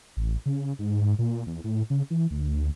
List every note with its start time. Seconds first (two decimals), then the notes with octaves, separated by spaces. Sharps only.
0.17 A1
0.46 C#3
0.79 G#2
1.01 G#2
1.19 A#2
1.47 E2
1.64 A2
1.90 C#3
2.10 E3
2.31 D2